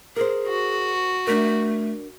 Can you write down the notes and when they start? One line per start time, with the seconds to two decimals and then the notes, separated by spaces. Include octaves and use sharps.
0.16 G#4 A#4 C5
0.48 F#4
1.27 A3 D4 A#4